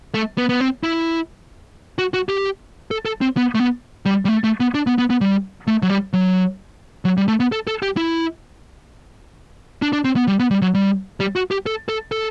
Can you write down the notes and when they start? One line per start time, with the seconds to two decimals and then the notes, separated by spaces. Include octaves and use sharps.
0.14 A3
0.38 B3
0.49 B3
0.60 C4
0.83 E4
1.98 F#4
2.14 F#4
2.29 G4
2.91 A4
3.05 A4
3.21 C4
3.37 B3
3.55 A3
3.60 B3
4.06 G3
4.25 G3
4.28 A3
4.44 A3
4.60 B3
4.74 D4
4.87 B3
4.98 B3
5.10 B3
5.21 G3
5.67 A3
5.82 F#3
5.90 G3
6.13 F#3
7.05 F#3
7.17 G3
7.28 A3
7.40 B3
7.52 A4
7.67 A4
7.82 G4
7.97 E4
9.82 D4
9.93 D4
10.04 C4
10.16 B3
10.28 G3
10.40 B3
10.51 G3
10.62 F#3
10.74 G3
11.20 G3
11.36 F#4
11.51 G4
11.66 A4
11.89 A4
12.12 A4